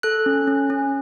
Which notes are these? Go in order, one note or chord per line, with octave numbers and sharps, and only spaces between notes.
A4 F#6
C#4
C#4
C#4